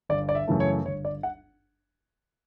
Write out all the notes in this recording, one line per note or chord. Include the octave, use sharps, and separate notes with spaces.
G1 D5
D5
E5
F#2 C#3 E3 A3
C#5
G1 C#5
D5
F#5